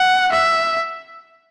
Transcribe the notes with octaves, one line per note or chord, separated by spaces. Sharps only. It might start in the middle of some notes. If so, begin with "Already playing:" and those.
Already playing: F#5
E5